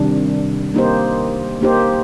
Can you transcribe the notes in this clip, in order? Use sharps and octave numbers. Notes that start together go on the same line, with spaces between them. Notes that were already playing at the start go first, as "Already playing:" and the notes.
Already playing: C3 D#3 G3 D4
A#3 D#4 G4 C5
A#3 D#4 G4 C5